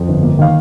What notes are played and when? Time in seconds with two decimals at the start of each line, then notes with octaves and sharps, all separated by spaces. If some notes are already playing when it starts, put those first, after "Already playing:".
Already playing: F2
0.08 G1
0.23 A#3
0.39 D#3 F5